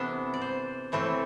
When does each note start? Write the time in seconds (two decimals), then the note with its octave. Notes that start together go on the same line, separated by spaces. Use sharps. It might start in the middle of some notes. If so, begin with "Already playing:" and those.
Already playing: C3 E3 B3 D4 A4
0.34 D5
0.41 C5
0.92 A2 E3 A3 C4 A4